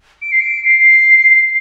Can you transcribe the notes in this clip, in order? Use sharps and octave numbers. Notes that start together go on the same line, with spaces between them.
D7
C7
D7
C7